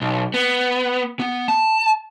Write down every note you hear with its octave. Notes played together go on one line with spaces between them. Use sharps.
B1
B3
B3
A5